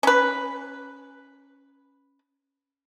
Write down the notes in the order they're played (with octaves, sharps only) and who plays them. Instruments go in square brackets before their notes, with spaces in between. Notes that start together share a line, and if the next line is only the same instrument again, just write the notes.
[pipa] C#4 B4